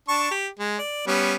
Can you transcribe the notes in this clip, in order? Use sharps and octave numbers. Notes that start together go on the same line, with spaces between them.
D4 A5 C#6
G4
G#3
D5
G3 B3 C#4